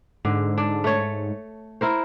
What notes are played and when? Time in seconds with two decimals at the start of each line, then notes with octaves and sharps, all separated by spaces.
0.25 G#2 D3
0.58 D4
0.84 A3 C#5
1.81 E4 A#4 C5